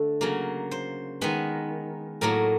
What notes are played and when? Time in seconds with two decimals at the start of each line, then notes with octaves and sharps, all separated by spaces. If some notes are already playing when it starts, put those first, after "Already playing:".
Already playing: D3 A3
0.21 C#3 F#3 A#3
0.71 C5
1.21 D#3 G#3 B3 B4
2.21 A2 F#3 A#3 A#4